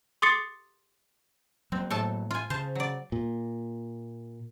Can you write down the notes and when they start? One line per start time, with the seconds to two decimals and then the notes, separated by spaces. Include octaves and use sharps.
0.22 C6 D6 D#6 A6 C7 C#7
1.72 F#3 A#3 C4
1.90 A2 A4 A5
2.31 F4 G#5
2.50 C#3 C5 A5
2.75 F#3 D5
3.12 A#2